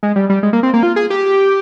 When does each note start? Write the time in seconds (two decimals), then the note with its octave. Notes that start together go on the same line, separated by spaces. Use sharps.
0.03 G#3
0.16 G3
0.30 G3
0.43 G#3
0.53 A#3
0.63 C4
0.74 A#3
0.83 F4
0.96 G#4
1.10 G4